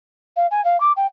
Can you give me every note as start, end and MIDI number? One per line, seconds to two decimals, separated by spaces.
0.37 0.47 77
0.51 0.64 80
0.65 0.80 77
0.80 0.93 86
0.97 1.06 79